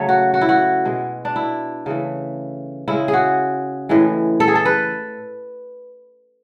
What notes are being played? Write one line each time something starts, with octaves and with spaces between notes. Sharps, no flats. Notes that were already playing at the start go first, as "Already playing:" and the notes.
Already playing: C#3 F#3 A3 C#5
F#4
F#4
E4
F#4
B2 G#3
D4
E4
C#3 E3 A3
C#3 G#3 E4
G#4
F#4
A2 E3 G#3
A4
G#4
A4
B4